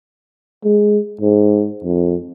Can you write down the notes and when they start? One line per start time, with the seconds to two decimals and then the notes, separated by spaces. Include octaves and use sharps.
0.64 G#3
1.21 G#2
1.84 F2